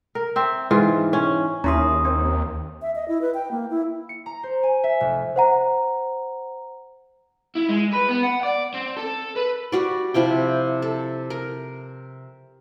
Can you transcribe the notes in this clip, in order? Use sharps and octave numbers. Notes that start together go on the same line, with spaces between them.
A#4
C4 E5
G#2 E3 F4
C#4
D#2 C#4 E4 A#5 C6 D#6
C4
E5
D#5
E4
B4
G5
A#3
E4
C#7
A#5
C5
G#5
E5
F1
C5 F#5 A#5
E4
G#3
B4
B3
F#5
D5
C4
A4
B4
G3 F#4 D5
C3 F3 E4 G5
A4
A#4